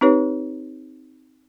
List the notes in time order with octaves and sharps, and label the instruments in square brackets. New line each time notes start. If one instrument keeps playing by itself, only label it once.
[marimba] C4 D#4 G4 B4 C#5